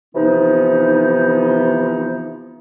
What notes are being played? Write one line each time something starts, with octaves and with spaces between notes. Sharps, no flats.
C3 E3 F3 B3 D#4